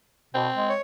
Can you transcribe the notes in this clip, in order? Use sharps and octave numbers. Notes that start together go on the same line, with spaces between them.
B2 C4
G#3
C#5